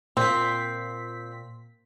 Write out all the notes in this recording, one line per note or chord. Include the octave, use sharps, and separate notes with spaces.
A#2 C4 B6